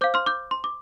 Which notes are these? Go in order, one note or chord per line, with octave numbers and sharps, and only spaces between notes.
C5 F5 D6 G6
C6 F6
D6 G6
C6
D6